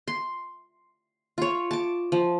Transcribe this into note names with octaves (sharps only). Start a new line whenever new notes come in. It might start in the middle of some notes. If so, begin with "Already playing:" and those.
C6
F4 C#5
A5 D6
F3